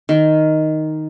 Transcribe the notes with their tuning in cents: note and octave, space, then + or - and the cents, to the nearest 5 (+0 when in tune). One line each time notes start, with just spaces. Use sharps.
D#3 +0